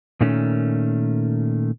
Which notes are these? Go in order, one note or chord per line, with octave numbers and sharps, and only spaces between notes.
A#2 D#3 A3 C#4